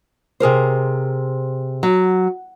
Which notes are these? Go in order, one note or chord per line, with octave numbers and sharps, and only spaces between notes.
C3 G#4 A#4 C5
F#3